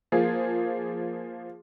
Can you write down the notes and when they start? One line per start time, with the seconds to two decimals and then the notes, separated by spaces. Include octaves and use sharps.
0.12 F3 A#3 G#4